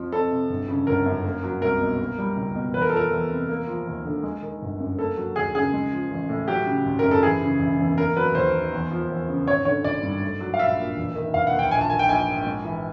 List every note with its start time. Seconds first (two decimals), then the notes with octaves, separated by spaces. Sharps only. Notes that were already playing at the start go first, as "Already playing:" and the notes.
Already playing: F2 F3
0.12 F2 A4
0.31 C3
0.49 G1
0.68 C#3
0.87 G1 A#4
1.06 F#2
1.25 A#3
1.44 F#3
1.62 C2 A#4
1.81 B2
2.00 A#3
2.18 G3
2.37 C#2
2.55 B2
2.74 E2 B4
2.82 A#4
2.90 A4
2.93 F3 A#4
3.12 E2
3.30 C3
3.49 A#3
3.68 F3
3.87 D#2
4.05 D3
4.23 G#3
4.42 D#3
4.62 G1
4.80 F#2
4.98 A#3 A4
5.17 F#3
5.36 D#2 G#4
5.55 C#3 G#4
5.73 G#3
5.92 F3
6.11 A1
6.29 A2
6.48 F#3 G4
6.66 C#3
6.85 G#1
6.99 A#4
7.04 F#2
7.11 A4
7.23 E3 G#4
7.41 C#3
7.60 E1
7.79 E2
7.97 A#3 A#4
8.17 F#3 B4
8.35 D#2 C5
8.54 D#3
8.73 E2
8.91 F3
9.10 E2
9.28 C#3
9.47 G#1 C#5
9.65 D3 C#5
9.84 G#1 D5
10.03 G2
10.22 A3
10.41 F#3
10.54 F5
10.59 A#1 E5
10.78 A#2
10.97 E1
11.15 D#3
11.34 E1 F5
11.47 F#5
11.53 D#2
11.59 G5
11.71 A#1 G#5
11.81 A5
11.90 D#3 G#5
11.99 G5
12.09 A#1 G#5
12.27 G#2
12.46 G#3
12.65 E3